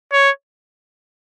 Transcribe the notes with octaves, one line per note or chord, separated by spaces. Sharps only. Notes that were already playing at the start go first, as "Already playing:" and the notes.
C#5